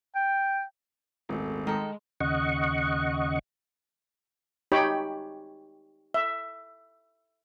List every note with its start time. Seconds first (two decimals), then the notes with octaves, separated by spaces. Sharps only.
0.15 G5
1.29 D#1 G#1 A3
1.67 D#3 G#3 A4
2.20 D#2 C#3 D#5 F#5 C#6
4.72 D#4 G4 C#5 G5 B5
6.14 E5